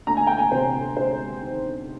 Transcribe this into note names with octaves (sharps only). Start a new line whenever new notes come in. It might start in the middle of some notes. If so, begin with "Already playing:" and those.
D2 A#5
G#5
G5
G#5
C3 C5
G#3 C5
D#3